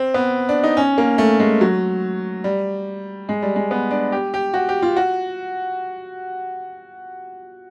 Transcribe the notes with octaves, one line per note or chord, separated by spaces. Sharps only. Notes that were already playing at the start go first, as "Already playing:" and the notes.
Already playing: C4
B3
D4
D#4
C#4
A#3
A3
G#3
F#3
G3
G#3
G3
G#3
B3
D4
G4
G4
F#4
G4
F4
F#4